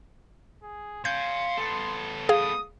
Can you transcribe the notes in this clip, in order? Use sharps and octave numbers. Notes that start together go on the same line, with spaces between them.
G#4
F5 G#5 C6 G6
B3 A4
G#4 F5 D#6